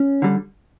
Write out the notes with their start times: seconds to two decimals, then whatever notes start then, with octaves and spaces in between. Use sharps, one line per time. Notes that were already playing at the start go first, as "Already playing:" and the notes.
Already playing: C#4
0.22 D3 G3